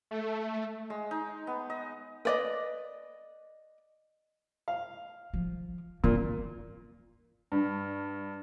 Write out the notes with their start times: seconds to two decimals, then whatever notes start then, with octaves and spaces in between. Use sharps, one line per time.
0.11 A3
0.90 G#3
1.11 D#4
1.47 B3
1.70 D#5
2.25 B4 D5 D#5
4.68 F5
5.34 F3
6.04 A#2 D3 E3
7.52 G2